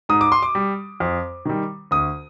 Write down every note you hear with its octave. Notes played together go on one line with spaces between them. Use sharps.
G#2 D#6
D6
C6
D6
G3
F2
D#3 G3
D2 D#6